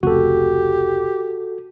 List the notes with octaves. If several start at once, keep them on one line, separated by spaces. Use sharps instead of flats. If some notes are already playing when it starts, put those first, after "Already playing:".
F1 C#2 F#4 G4 A4